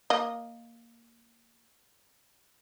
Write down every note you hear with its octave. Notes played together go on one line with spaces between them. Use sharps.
A#3 D#5